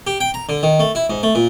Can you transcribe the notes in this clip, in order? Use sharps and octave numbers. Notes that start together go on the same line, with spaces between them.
G4
G5
A#5
D3
D#3
A3
E4
G#2
A3
A#2